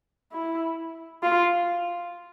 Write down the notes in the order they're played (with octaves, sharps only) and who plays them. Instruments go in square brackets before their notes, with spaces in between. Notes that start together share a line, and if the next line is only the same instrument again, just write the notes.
[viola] E4
F4